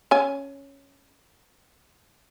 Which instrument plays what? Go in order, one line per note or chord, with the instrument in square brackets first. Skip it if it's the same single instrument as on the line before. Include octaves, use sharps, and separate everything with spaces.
[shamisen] C#4 G#5